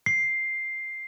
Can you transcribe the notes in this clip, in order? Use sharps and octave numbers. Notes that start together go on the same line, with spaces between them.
C7